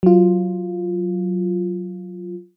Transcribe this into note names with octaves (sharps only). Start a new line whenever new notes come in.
F#3 F4